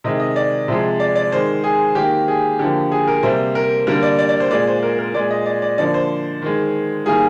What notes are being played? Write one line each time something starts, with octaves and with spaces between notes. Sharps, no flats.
C3 D#3 G#3 D#5
D#5
D5
C3 F3 G#3
D5
D5
D#3 G#3 C5
G#4
D#3 A#3 G4
G#4
D3 F3 A#3 G4
G#4
A#4
C3 G3 A#3 C5
A#4
D3 G3 A#3 A#4
D5
D5
D5
C5
A#2 G#3 D5
C5
A#4
A#4
A#2 G#3 D5
D#5
D5
D5
D3 F3 A#3 D5
C5
D#3 G#3
D#3 G3 A#3 G#4